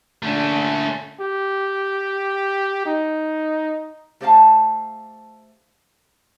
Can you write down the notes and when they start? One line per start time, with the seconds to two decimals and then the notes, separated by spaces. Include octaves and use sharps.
0.23 A#2 D3 A3 C#4
1.20 G4
2.86 D#4
4.21 A3 G4 C5 D#5 F5 A5